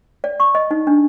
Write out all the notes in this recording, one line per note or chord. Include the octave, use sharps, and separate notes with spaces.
D5
C#6
D#5
D#4
D4